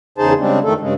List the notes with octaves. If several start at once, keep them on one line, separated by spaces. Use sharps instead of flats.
E2 C#3 D#4 G#4 C5 A5
C#3 G3 G#3 C4 D4
F2 D#3 A3 A4
G2 C#3 G#3